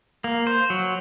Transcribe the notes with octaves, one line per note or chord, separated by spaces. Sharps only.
A#3
C5
F#3